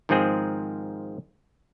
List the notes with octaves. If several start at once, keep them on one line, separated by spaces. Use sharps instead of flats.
G#2 D#3 F3 G#3 C4 G#4